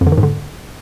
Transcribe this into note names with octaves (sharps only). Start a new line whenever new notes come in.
F2
D3
D#3
G#2
D3